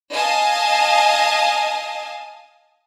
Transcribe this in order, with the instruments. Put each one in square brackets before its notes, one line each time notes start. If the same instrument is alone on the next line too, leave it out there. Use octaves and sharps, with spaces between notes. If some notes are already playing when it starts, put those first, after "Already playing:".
[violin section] D#5 F5 G#5 A5 D#6